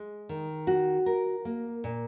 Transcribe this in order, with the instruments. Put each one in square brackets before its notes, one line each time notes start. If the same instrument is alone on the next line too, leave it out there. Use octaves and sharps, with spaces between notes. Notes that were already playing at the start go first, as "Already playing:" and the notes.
Already playing: [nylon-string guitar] G#3
D#3
F#4
A#4
A#3
A#2